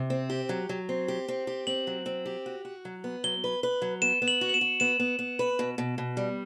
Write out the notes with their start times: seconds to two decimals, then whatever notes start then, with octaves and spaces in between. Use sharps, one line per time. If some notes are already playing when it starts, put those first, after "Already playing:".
Already playing: C3
0.10 C4
0.30 G4
0.49 F#3
0.69 F#3
0.89 C4
1.08 G4
1.28 C4
1.47 G4
1.67 C4 F#7
1.87 F#3
2.06 C4
2.26 G4
2.46 F#4
2.65 F#4
2.85 F#3
3.04 B3
3.24 F#3 G7
3.44 B4
3.63 B4
3.82 F#3
4.02 B3 E7
4.22 B3
4.28 F#7
4.41 F#4
4.49 F#7
4.54 E7
4.61 F#4
4.80 B3 E7
4.99 B3
5.19 B3
5.39 B4
5.59 B2
5.78 B2
5.98 B2
6.17 G3